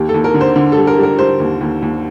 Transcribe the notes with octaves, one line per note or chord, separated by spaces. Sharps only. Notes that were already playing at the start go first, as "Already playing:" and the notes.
Already playing: D#2 G4
A4
D#2
A#4
D3
C5
D3
G3 A4
A#4
G3
A#4
G3 C5
D#2
D#2
D#2